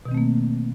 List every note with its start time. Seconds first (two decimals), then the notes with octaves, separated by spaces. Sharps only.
0.05 B2
0.08 D#3
0.11 C4
0.14 A3
0.17 A#3